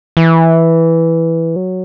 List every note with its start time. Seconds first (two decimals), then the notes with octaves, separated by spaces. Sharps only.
0.17 E3
1.56 F#3